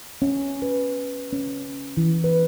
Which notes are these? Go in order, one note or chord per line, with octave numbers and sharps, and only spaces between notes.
C#4
B4
C#4
E3
B4